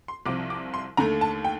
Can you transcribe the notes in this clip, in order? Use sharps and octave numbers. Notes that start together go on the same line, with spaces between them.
C6
C2 C3 F3 D6
D6
C6
D#2 D3 A3 A#5
A5
G5